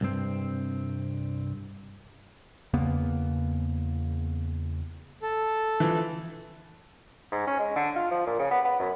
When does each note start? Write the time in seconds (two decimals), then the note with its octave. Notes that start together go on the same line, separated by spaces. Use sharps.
0.01 C2 G2 C4
2.73 E2 C#3 A#3 B3
5.22 A4
5.80 E3 F3
7.32 G#2
7.47 C#4
7.59 G#3
7.76 D3
7.96 F4
8.11 F3
8.27 A#2
8.39 C#3
8.51 B3
8.65 B3
8.80 F#2